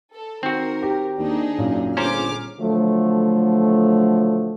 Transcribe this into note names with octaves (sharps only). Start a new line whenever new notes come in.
A4
D#3 C4 F#4 A#4
G4
D#2 D4 D#4 G#4
F#2 A#2
G1 C#4 G#4 C5 A#5 D6 F6
D3 F3 F#3 A3